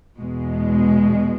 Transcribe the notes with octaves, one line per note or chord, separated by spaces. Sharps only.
E2 B2 G#3